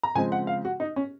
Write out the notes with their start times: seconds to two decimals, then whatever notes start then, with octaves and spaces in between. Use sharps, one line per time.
0.03 A#5
0.15 C#3 F3 G#3 C4 G#5
0.32 F#5
0.47 F5
0.65 F#4
0.80 D#4
0.96 C#4